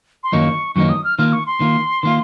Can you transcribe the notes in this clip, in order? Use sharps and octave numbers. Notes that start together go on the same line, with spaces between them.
C6
F#2 D#3 F#3 A#3 D#4 C#6
F#2 D#3 F#3 A#3 D#4 C#6
D#6
F6
D#3 A#3 F4 F6
C#6
C6
D#3 A#3 F4
D#3 A#3 F4